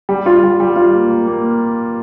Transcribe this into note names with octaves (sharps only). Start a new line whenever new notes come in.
G3
F4
G3
G3
F4
A#3
A#3
A#3